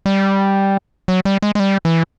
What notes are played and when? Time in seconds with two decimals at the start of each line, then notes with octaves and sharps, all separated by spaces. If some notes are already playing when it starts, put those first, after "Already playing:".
0.06 G3
1.08 F#3
1.25 G3
1.43 G#3
1.55 G#3
1.60 G3
1.85 E3